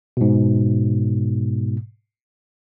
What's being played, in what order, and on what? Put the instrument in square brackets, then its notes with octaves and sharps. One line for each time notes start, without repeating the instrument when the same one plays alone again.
[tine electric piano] G#2 B2